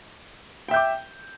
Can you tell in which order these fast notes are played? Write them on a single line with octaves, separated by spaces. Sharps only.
G5 E5 G6 D6